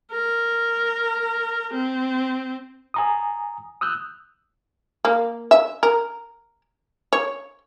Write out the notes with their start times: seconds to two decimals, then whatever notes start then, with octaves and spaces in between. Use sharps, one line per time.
0.12 A#4
1.74 C4
2.94 G#5 A#5 D#6
3.81 D#6 E6 F#6 G6
5.05 A#3
5.51 E5
5.83 A#4
7.13 C#5